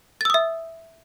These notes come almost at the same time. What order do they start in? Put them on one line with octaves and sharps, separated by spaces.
A6 E6 D#6 E5